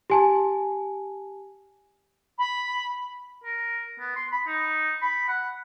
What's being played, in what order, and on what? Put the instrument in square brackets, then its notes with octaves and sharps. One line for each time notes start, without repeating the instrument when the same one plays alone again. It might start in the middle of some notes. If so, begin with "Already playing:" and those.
[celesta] G4 G#5 A5
[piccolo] B5
[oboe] A#4
B3
C6
B5
D#4
B5
F#5